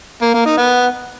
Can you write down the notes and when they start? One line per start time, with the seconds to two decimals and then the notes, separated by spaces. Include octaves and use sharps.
0.22 A#3
0.34 A#3
0.46 D#4
0.58 B3